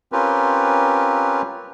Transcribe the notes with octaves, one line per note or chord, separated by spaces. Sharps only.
C4 C#4 F4 G4 A#4 B4